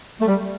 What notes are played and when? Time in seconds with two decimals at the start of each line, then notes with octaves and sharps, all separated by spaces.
0.21 A3
0.27 G3